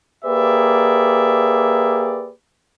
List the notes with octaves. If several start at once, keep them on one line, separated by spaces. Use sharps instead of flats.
A#3 G4 G#4 B4 D5 E5